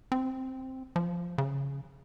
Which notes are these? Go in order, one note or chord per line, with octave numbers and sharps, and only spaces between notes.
C4
F3
C#3